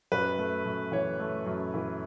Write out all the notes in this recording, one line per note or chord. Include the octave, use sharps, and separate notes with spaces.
F#2 B4
A3
F#2
E3 C#5
A3
F#2
E3